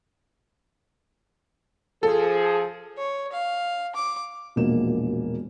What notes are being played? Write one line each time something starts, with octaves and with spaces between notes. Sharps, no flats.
F3 G#4 A4
C#5
F5
D6
E1 A#1 B2 A#3 E7